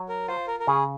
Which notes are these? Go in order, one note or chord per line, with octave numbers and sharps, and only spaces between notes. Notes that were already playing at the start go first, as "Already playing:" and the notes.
Already playing: F#3
A#4
F4 C5
A#4
A#4
C#3 G#4